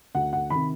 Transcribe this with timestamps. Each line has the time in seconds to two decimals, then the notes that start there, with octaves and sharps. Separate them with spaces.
0.15 D2 F#5
0.33 F#5
0.50 C3 D#3 B5